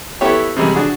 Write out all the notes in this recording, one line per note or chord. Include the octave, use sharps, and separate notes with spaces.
B3 E4 G4 A4 C#5
C3 G3 G#3
D4 F#4 G#4